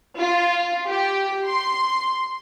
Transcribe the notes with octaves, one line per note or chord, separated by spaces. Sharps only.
F4
G4
C6